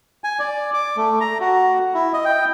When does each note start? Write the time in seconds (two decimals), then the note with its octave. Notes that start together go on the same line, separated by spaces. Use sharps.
0.24 G#5
0.39 D5
0.74 D6
0.97 A3
1.21 A#5
1.40 F#4
1.94 E4
2.13 D#5
2.25 G5